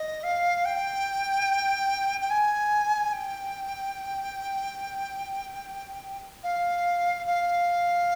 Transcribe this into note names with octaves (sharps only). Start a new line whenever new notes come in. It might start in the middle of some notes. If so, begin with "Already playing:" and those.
Already playing: D#5
F5
G5
G5
G#5
G5
F5
F5